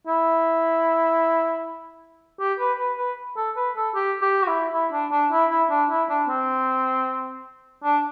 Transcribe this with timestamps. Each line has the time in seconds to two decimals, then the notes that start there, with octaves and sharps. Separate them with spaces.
0.07 E4
2.40 G4
2.59 B4
2.79 B4
2.98 B4
3.37 A4
3.56 B4
3.76 A4
3.95 G4
4.22 G4
4.43 F#4
4.47 E4
4.73 E4
4.92 D4
5.12 D4
5.31 E4
5.51 E4
5.70 D4
5.90 E4
6.09 D4
6.29 C4
7.84 D4